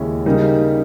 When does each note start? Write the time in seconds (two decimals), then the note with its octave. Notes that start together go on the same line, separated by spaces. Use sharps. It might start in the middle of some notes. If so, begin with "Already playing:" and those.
Already playing: D#2 C#3 G#3 C#4 E4
0.26 C#3 G3 A#3 D#4